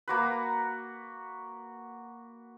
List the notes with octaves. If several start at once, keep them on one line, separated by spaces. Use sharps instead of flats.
A#3 F#4 B4